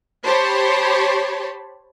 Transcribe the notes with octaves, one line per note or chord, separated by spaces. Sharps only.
G4 C5 C#5 A5 B5